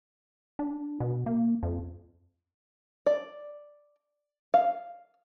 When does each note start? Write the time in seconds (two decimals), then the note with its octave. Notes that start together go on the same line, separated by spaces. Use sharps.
0.59 D4
1.00 B2
1.26 A#3
1.63 F2
3.06 D5
4.54 F5